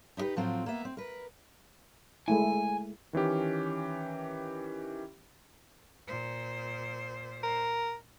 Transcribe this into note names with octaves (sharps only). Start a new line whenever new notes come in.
D#4 E4 F#4 G4 B4
A2 F3 F#3 C4 F4
A#3 B3 E5
C4
A#4 B4
G#3 A3 E4 G#5
D#3 E3 C#4 G4
A#2 C5
A#4